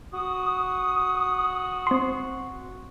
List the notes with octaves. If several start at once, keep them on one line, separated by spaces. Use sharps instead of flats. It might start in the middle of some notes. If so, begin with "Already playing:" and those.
F#4 D#6
C4 C6